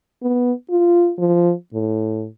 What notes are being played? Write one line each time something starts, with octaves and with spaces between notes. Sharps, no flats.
B3
F4
F3
A2